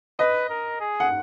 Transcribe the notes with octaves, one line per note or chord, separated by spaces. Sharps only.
B4 D#5
A#4
G#4
F#5